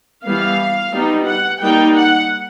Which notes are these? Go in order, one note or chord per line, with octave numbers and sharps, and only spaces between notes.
E3 G3 B3 F5
G3 B3 D#4
F#5
G3 A#3 D#4 G5
F#5